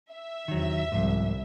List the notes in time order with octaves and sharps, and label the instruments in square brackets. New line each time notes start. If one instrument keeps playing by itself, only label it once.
[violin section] E5
[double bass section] E2 C3 [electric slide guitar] D#3 F#3
[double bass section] G1 C2 [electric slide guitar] G#2 F3